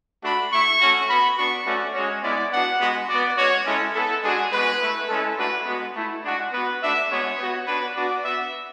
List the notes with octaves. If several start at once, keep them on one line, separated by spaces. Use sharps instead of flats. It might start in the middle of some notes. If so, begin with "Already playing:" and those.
A3 D4 F#4 B5
A3 E4 C#6
A3 C#4 F#4
B3 F#4 B5
B3 D4 F#4 C#6
A3 C#4 F#4 D5
G#3 C#4 F#4 C#5
G#3 B3 E4 D5
B3 D4 F#4 F#5
G#3 B3 F#4
B3 F#4 D5
G#3 C#4 F#4 C#5
G#3 C#4 E4 A4
B3 E4 A4
G#3 D4 F#4 G#4
G#3 B3 F#4 B4
A3 E4
G#3 C#4 E4 A4
A3 D4 F#4 B4
G#3 B3 F#4
A3 E4
G#3 D4 F#4
B3 F#4 B4
A3 D4 F#4 E5
G#3 B3 F#4 C#5
B3 F#4
B3 D4 F#4 B4
B3 D4 F#4 D5
B3 F#4 E5